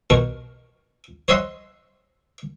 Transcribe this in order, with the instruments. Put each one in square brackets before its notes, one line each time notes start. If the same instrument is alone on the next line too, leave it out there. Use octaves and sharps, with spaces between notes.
[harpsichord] B2 A#4 C#6
C5 C#5 D#5 E5 F#5 C6